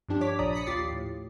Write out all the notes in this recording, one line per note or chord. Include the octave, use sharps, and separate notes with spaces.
G2 F3 D4 G4
C#5 D6 B6
A#1 F3 D5 A#5 D#6
B5 D#6 B6 C#7
D#2 F4 G4 D6 A6 C7
A2